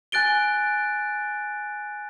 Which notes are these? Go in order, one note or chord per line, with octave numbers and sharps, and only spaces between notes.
G#5 F#6 A6 D7 G7